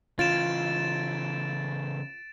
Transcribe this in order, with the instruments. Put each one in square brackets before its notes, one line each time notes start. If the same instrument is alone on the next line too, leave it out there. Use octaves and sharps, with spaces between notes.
[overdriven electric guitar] C#3 E3 [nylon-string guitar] F4 [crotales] A6 D7 E7